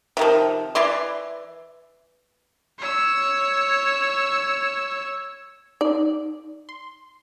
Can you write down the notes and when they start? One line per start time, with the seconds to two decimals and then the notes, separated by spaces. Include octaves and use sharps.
0.17 C3 D#3 F3
0.75 E3 E4 D5 C6
2.79 C#5 E6
5.81 D#4 D5
6.69 C6